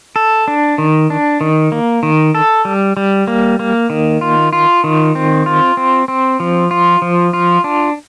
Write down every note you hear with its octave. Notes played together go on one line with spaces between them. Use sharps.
A4
D4
D#3
D4
D#3
A#3
D#3
A4
G3
G3
A#3
A#3
D#3
F4
F4
D#3
C4
F4
C4
C4
F3
F4
F3
F4
D4